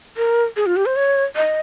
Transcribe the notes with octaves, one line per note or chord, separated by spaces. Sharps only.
A#4
G#4
F4
G4
C5
C#5
D#5